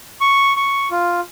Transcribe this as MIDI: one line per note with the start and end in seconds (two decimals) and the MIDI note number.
0.21 0.53 85
0.56 0.88 85
0.91 1.20 65